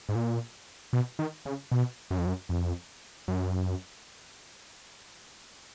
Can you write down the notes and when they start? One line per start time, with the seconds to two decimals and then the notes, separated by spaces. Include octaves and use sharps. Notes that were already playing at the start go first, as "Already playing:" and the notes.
0.09 G#2
0.15 A#2
0.93 B2
1.19 D#3
1.46 C#3
1.72 B2
2.11 F#2
2.18 F2
2.26 F#2
2.49 F2
3.28 F#2